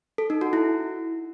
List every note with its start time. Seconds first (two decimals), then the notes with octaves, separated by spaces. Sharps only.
0.18 A4
0.30 D#4
0.41 F#4
0.53 E4